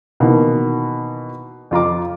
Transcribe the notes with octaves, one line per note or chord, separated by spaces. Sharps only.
B2 D#3 E3 A#3
F2 F4 A#5 D6